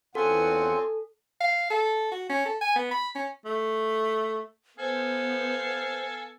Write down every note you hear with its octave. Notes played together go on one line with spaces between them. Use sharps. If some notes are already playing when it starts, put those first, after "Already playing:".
E2 C4 C#4 F4 A4 F#5 G#5
F5
A4
F#4
C#4
A4
G#5
B3
B5
C#4
A3
B3 A4 C5 F5 G#5